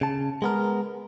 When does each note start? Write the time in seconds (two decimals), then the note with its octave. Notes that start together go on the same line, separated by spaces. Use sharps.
0.01 C#3 A5
0.42 G#3 B3 A#4